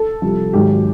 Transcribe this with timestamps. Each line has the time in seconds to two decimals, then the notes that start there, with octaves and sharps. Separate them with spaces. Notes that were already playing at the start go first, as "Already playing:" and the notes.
Already playing: A4
0.22 C2 C3 F3
0.53 G#1 G#2 D#3 F#3 G4